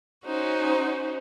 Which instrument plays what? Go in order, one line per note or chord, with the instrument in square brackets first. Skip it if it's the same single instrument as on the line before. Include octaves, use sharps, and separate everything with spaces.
[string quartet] C#4 D#4 F#4 C5